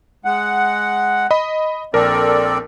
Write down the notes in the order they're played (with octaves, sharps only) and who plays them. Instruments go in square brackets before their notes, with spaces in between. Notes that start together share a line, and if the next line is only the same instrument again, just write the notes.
[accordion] G#3 F#5
[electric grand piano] D#5 B5
[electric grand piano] A#1 A#4 [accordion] C4 A4 D5